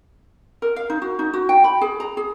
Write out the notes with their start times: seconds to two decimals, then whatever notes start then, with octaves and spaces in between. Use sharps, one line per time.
0.62 A#4
0.76 F5
0.90 D#4
1.02 F#4
1.19 D#4
1.34 F#4
1.49 G5
1.64 B5
1.81 G#4
2.00 A#5
2.17 G#4